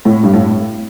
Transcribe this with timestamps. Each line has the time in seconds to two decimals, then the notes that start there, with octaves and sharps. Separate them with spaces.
0.05 A2
0.23 G2
0.34 A2